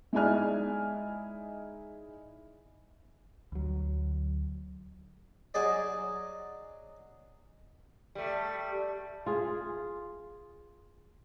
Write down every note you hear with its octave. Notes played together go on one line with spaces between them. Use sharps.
G#3 D#4 E4 D5 G#5 F6
D2 F#3
F#3 D#4 G#4 D5 D#5
G3 A3
F4 G#4